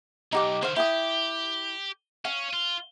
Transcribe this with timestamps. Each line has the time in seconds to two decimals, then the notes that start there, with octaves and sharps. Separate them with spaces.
0.33 B1 D#4 G4 D6
0.63 D3 D#3 C5 F5
0.76 E4 G4 G5 D#6
2.25 C#4 F5
2.53 F4